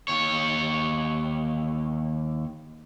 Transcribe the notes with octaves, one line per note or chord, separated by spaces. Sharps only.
D#2 C#5